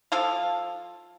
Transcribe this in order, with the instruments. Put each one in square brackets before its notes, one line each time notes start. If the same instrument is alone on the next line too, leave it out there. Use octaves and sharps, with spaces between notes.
[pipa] F3 A4 F5